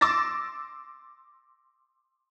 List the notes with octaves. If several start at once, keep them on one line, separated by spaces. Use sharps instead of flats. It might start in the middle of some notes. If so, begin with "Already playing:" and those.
C6 D6 E6 A6 A#6